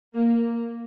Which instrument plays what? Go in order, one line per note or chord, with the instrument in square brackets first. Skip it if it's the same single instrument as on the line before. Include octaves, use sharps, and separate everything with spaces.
[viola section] A#3